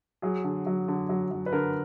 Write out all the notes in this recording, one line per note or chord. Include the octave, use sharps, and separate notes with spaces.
F#3 G#4
D3
F#3
D3
F#3
F#3
B4
D3 A#4